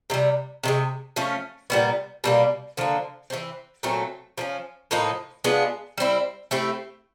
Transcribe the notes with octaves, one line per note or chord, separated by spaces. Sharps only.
C3 D#3 G3
C3 D#3 G#3
F3 A3 C#4
A#2 G3 B3
B2 G3 A#3
D3 F3 A#3
E3 G3 C4
A#2 F#3 A3 C4
F3 A3 C#4
A2 F3 A#3 D#4
G#3 B3 D4 F4
G3 C4 E4
A3 C4 E4 G4